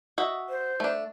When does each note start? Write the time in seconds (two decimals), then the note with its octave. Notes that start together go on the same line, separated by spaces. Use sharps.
0.18 F#4 D#5 E5
0.49 C5
0.80 A3 D4